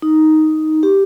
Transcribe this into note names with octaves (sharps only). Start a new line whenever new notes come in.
D#4
G4